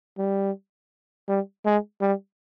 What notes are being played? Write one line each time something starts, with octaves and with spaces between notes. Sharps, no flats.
G3
G3
G#3
G3